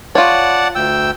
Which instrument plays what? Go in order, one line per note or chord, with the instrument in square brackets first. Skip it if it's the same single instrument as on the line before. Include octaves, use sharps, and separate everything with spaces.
[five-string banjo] F4 C#5 [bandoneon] D5 F#5 A5
[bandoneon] D2 G5 E6